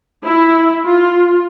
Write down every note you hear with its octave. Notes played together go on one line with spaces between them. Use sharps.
E4
F4